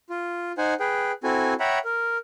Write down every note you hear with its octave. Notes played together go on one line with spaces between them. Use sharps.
F4
D#4 C5 F#5 G#5
G#4 B4 G5
C4 E4 F#4 A4 G#5
C#5 E5 F#5 G5 A#5 B5
A#4